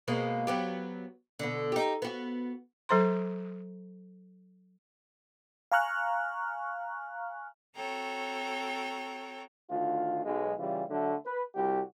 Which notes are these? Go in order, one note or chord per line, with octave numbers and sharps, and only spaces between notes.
B2 G#3 A#3
F#3 B3 G4
B2 D3
D#4 G4
B3 F#4
F#3 A4 C5 A#5 C6
F5 G#5 A#5 C#6 F6 F#6
C4 F#4 A4 C#5 G5 A#5
D2 D#3 F4
B1 G#3
C#3 E3 G3 F4
D3 F#3 A3
B4
C2 G3 F#4 G4